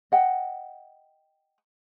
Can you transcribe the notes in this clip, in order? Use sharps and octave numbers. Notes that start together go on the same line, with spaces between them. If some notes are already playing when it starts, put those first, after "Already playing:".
D#5 F#5 G5